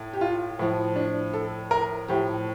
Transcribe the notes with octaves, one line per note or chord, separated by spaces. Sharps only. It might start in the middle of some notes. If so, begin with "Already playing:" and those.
Already playing: A2
G4
F4
A2 F3
D4
A4
A#4
A2 F3 G4